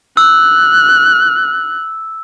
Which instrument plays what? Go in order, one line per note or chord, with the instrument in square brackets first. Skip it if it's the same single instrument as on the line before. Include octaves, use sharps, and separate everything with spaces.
[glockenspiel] E6 [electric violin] F#6